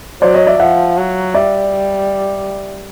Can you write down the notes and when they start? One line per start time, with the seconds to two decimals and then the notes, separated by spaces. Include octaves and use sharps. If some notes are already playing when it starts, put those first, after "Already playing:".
0.22 F#3 C5 D5
0.34 C#5 D#5
0.47 D5 E5
0.60 F3 E5 F#5
0.97 F#3
1.34 G3 D5 E5